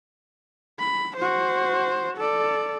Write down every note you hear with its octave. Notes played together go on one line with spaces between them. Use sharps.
B5
F#4 C5
A4 D5